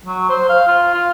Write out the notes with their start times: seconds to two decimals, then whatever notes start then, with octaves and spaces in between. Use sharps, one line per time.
0.06 F#3
0.29 C5
0.49 F5
0.68 F4
0.94 F4